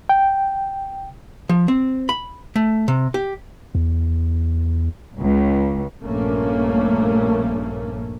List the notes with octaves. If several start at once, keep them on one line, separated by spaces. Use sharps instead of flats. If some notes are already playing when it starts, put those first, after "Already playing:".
G5
F3
C4
B5
A3
C3
G4
E2
C#2
A#1 G2 A3 A#3 C#4